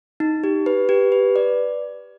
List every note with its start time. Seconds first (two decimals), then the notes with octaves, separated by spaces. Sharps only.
0.20 D#4
0.44 G4
0.66 B4
0.89 G4
1.12 B4
1.36 D5